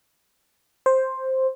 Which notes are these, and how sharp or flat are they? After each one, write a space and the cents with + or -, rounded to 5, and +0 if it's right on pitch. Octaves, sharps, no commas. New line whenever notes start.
C5 +5